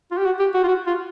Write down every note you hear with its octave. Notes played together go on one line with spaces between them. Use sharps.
F4
G4
F#4
G4
F#4
F4
F#4
F4